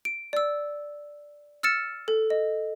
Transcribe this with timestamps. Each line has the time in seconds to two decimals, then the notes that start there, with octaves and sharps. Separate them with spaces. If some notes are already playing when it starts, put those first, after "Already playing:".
0.05 D7
0.33 D5 E6
1.63 E6 F6 A6 C#7 E7
2.08 A4
2.30 D#5